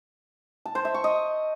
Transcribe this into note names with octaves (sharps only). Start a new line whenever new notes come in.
A5
C5
E5
C#6
D#5